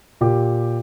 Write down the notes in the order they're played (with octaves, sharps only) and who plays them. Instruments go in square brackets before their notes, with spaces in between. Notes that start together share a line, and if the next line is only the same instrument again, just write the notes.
[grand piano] A#2 G4